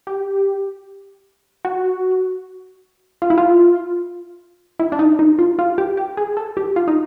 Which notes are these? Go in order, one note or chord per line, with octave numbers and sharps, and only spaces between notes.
G4
F#4
F4
E4
F4
E4
D4
D#4
D#4
F4
F4
G4
G4
G#4
A4
G4
F4
D#4